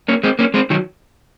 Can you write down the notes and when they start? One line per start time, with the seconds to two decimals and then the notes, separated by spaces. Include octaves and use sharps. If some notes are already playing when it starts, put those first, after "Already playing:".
0.08 A#3 C#4
0.23 G#3 C4
0.39 A#3 C#4
0.54 G#3 C4
0.70 D#3 F#3